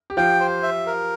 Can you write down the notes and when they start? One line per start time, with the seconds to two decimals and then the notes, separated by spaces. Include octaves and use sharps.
0.10 G4
0.17 F3 F4 G5
0.40 C5
0.63 E5
0.87 A#4